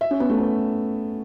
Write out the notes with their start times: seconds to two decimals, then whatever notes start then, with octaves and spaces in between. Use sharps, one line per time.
0.01 E5
0.11 C#4
0.20 B3
0.30 A3
0.39 B3